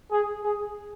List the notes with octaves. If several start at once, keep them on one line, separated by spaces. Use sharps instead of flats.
G#4
G#4